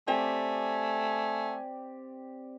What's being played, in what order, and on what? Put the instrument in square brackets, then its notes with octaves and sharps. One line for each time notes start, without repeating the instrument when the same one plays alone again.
[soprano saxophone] A3 [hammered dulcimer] C4 G4 D5 [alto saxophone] G#5